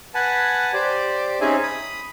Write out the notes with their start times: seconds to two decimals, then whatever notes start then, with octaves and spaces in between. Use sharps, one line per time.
0.14 B4 F#5 G#5 A5
0.73 G4 C5 D5
1.41 C4 C#4 D#4 G#4 E5 G#5
1.63 B5 D#6